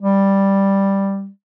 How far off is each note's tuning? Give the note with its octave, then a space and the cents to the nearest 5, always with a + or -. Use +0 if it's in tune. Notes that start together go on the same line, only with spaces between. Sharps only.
G3 +0